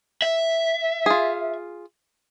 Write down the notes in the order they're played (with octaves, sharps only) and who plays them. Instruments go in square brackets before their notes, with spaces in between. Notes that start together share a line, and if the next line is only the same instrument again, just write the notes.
[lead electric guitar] E5
[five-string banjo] F4 G#4